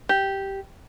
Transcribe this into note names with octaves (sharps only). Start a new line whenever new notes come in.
G4